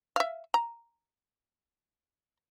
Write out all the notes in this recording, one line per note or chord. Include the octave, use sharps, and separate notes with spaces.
E5 F5
A#5